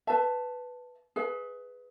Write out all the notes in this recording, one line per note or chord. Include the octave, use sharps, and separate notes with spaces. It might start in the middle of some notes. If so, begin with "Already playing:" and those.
B4 E5 A5
G#4 B4 E5